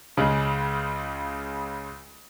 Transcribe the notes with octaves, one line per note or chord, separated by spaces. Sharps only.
C#2 C#3 G#3